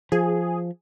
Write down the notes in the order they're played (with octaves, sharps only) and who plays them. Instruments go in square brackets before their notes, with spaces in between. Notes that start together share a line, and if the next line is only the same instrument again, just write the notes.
[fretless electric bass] F3 [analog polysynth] G#4